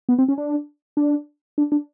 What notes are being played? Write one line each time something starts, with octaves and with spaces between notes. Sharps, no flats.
B3
C4
C#4
D4
D4
D4
D4